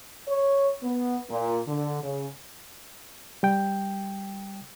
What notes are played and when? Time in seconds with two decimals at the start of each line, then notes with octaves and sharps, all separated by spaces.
0.28 C#5
0.83 B3
1.30 A#2
1.68 D3
2.03 C#3
3.43 G3 G5